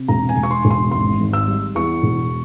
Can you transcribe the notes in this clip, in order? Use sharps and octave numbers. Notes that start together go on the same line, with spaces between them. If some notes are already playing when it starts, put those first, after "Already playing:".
Already playing: C3
E1 A#5
G#5
E1
C#6
C6
E1
C6
G#1 C6
G#1
E6
G3
E2 C#6
E1